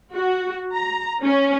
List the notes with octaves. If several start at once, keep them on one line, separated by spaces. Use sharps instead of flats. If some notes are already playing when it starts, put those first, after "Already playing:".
F#4
A#5
C#4